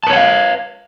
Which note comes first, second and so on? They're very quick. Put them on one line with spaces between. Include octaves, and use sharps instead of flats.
A5 B4 C#5 F#5 F5